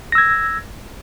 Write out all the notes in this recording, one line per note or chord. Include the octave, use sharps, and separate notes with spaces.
E6 G#6 A#6